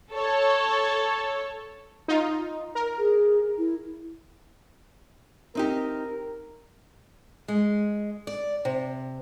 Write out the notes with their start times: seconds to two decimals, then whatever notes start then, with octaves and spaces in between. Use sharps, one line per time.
0.13 A4 C#5
2.08 D#4 F4
2.75 A#4
2.98 G#4
3.58 E4
5.55 C4 D#4 G4 A#4
7.48 G#3
8.27 D5
8.65 C3